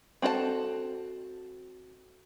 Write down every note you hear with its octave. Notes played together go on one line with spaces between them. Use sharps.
C4 F#4 A4 D5 A5